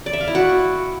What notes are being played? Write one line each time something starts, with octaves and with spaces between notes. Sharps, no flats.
D5
E5
F5
E4
F#4